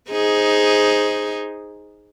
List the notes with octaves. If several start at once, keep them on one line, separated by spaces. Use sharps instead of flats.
D#4 G#4 C5